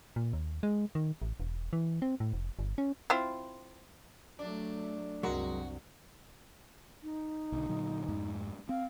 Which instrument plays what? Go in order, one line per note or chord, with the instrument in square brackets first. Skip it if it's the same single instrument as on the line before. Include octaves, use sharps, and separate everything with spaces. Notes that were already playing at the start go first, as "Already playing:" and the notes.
[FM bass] A#2
D#2
G#3
D#3
A1
E1
E3
C4
A2
F1
G1
C#4
[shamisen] C4 E4 F4
[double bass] F#3 A3 [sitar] D4
[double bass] C2 F#2 [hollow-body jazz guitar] F#3 G#3 A#4 [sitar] F#4
[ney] D#4
[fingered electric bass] B1 D3
A#2 D3 F#3
F2 G#2
[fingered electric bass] C4 [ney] F5